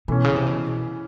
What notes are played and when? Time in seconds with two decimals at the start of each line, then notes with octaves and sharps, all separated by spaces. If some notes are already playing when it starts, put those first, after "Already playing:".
0.08 B2 E3 A3 C#4
0.25 C#3
0.36 C3
0.46 B2